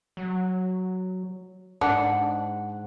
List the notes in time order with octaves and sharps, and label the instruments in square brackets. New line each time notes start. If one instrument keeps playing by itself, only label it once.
[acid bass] F#3
[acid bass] G#2 [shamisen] D4 [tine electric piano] F#5